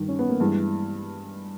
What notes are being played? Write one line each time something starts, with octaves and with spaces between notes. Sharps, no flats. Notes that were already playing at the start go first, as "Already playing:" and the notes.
Already playing: G2 D#3
C#4
B3
A#3
G2 E3 G#3